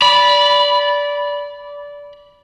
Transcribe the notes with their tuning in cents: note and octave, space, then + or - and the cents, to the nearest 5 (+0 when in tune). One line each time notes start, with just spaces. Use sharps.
D5 -20 B5 -10